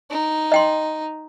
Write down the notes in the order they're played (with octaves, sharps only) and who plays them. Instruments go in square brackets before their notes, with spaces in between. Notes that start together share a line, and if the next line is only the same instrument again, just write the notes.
[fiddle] D#4
[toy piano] D#5 G5 C6